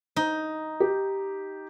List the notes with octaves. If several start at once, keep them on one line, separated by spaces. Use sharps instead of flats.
D#4
G4